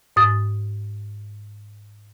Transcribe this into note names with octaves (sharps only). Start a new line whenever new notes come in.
G#2 D#6 A6